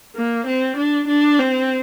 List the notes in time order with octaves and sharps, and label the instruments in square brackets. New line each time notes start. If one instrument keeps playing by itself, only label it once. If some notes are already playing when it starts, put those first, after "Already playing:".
[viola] A#3
C4
D4
D4
C4